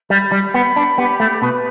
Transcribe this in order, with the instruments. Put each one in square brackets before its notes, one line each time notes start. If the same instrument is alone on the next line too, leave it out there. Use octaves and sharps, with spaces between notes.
[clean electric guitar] G3 [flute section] B5
[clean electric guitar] G3
[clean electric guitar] B3 [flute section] B5
[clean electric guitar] D4
[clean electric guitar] B3 [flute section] G4
[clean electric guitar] A3
[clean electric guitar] B2 [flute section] B4